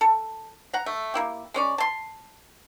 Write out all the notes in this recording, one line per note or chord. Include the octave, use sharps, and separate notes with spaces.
A4
F#5 A#5
A3
A#3 E4 G4
G#3 C#4 D5
A5 C6